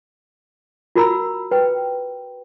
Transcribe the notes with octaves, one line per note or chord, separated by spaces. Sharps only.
F4 F#4 A#4 A#5 B5 E6
B4 G5